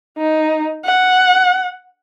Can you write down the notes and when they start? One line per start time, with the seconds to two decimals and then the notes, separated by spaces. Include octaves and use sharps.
0.17 D#4
0.85 F#5